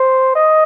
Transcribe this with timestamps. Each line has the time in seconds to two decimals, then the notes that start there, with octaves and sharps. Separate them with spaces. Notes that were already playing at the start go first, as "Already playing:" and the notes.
Already playing: C5
0.35 D#5